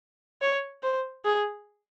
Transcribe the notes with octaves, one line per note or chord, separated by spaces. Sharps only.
C#5
C5
G#4